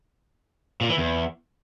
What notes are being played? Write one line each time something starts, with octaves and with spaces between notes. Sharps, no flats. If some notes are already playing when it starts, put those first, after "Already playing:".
A#2
E3
E2